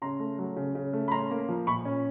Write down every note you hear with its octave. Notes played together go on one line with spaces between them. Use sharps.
C#3 A#5 C6
A3
F#3
C#3
C#3
A3
B5
C#4 A#5 C6
A#3
F3
A#2 B5 C#6
C#4